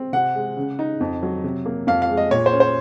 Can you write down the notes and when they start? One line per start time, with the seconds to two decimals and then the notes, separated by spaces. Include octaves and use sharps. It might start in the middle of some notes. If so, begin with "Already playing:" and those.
Already playing: C4
0.13 C3 F#5
0.35 G#3
0.57 C#3
0.79 D#4
1.01 F2
1.23 F#3
1.44 C3
1.66 A#3
1.87 F2 F5
2.02 F5
2.10 G#3
2.17 D#5
2.31 A#2 C#5
2.46 C5
2.53 C#4
2.60 C5